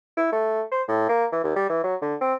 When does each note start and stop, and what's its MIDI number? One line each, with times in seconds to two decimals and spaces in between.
0.17 0.28 64
0.32 0.62 57
0.72 0.82 72
0.88 1.07 45
1.09 1.26 58
1.32 1.39 52
1.44 1.55 39
1.56 1.66 55
1.69 1.83 52
1.84 1.96 54
2.02 2.15 50
2.21 2.34 60